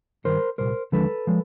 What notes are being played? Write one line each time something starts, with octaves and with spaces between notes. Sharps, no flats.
G2 D#3 G3 A#4 C5
C2 A#2 G3 A#4 C5
D#2 D3 F3 G#3 A4 B4
F3 G#3